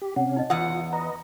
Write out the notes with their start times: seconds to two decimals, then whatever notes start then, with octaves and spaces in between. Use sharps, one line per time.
0.02 G4
0.16 C3 C#4 F#5
0.36 D#4 D#5
0.50 E2 F4 F#5 D#6
0.93 B4 D#5 A#5